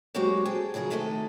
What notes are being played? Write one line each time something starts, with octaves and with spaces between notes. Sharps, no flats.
F#3 G#3 C4 F#4 G4
G#4 A4 G5
C#3 F3 F#3 G#4 A#4
C3 D#3 A3 A4 A#4 D#5